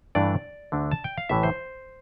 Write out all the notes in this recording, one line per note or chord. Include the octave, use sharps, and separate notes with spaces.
G2 E3 A3 D4 D5
D2 D3 A3 D4
A5
G5
F5
A1 A2 E3 E5
C5